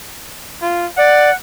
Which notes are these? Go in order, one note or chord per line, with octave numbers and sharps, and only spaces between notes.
F4
D5 F#5